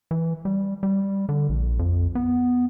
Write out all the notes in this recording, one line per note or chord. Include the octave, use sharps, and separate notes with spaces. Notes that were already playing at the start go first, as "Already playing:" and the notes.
E3
G3
G3
D3
A#1
F2
B3